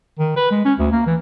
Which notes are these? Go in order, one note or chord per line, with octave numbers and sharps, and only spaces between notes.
D#3
B4
G#3
C#4
D2
A#3
E3